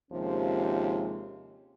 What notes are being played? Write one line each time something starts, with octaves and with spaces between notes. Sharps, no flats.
D#2 C3 F3 G#3 C#4